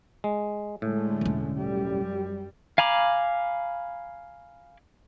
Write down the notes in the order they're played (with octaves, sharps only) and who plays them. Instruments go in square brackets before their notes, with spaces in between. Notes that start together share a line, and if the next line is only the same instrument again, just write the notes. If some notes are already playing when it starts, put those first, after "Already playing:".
[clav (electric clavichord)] G#3
[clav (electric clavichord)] A2 [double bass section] D3 G#3 A3
[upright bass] E1 C#4
[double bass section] F#2 G3
[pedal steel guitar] F5 G#5 A#5 B5 D6